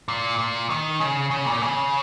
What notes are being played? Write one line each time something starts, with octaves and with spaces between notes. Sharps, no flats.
A#2
A#2
D#3
C#3
C#3
A#2
C#3